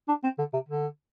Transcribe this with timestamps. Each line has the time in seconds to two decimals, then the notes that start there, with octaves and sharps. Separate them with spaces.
0.08 D4
0.24 C4
0.38 D3
0.53 C3
0.68 D3